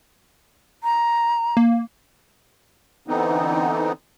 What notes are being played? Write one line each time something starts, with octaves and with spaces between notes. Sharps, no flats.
A#5
A#3
D3 E3 B3 C4 D#4